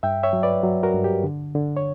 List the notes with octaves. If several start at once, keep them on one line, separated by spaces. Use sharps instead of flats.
G2 E5 G5
C#5 E5
F#3
B4 D5
F#3
F#4 A#4
G2
G4
D3
D3
C#5